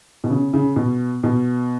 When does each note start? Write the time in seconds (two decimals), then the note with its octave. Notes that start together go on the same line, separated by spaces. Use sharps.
0.24 B2
0.30 C#3
0.53 C#3
0.76 B2
1.24 B2